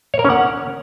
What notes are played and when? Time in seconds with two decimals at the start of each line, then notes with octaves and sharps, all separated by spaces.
0.14 C#5
0.19 A#4
0.24 C#4
0.30 F#5